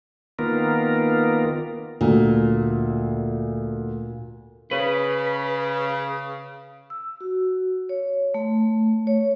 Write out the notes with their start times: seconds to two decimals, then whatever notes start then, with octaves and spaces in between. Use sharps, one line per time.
0.39 D#3 A#3 B3 F4 A#4
2.01 D2 A#2
4.71 C#3 B4
6.90 E6
7.21 F#4
7.89 C#5
8.34 A3
9.07 C#5